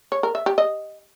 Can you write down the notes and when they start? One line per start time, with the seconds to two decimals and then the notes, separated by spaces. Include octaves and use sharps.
0.12 C#5
0.23 A#4
0.35 E5
0.46 G4
0.58 D#5